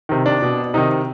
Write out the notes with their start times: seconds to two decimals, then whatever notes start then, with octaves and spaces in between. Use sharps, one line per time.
0.09 C3 D#3
0.26 D4
0.42 B2
0.74 C3 D#3 D#4